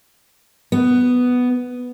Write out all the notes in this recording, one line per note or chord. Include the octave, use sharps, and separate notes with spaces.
B3